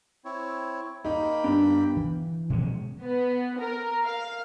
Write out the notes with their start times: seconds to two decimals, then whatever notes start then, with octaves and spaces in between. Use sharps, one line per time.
0.25 C4 E4 C#5
1.05 A#3 D#4 G5 B5
1.44 G2 B3 D4 D#4
1.97 E3
2.50 B2 F3 G#3 C#4
3.03 B3
3.59 A#4
4.05 F5